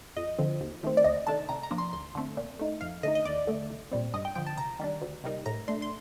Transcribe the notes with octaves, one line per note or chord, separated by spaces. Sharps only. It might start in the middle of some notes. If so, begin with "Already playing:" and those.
F2 D#5
D3 F3 C4
D#2
D#3 A3 C4
D5
D2 D#5
C3 D#3 A3 D4 A5
C3 A#5
A#5
F3 A#3 D4
C6
D2 C6
D3 A3 C4
A#2
A3 D#4
F2 F5
D3 A3 D#4 D#5
D#5
D#2 D5
D3 A3
C2
A#2 G3 C4
G2 D#5
G5
D3 F3 G5
A5
C3 A#5
D#3 G3 D4
D2
C3 G3 A#3 D#4
A2 A#5
A3 D4 C6
C6